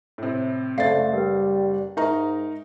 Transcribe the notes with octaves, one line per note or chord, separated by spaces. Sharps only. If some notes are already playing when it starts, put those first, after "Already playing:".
A2 C3
F#1 A3 C5 D5 F5 A6 C7
G3 A#4 B4
G#2 D#4 A#4 E5 A#5 C#6